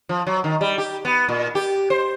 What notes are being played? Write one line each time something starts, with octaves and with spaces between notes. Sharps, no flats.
F3
F#3
D#3
G3
G4
B3
A#2
G4
C5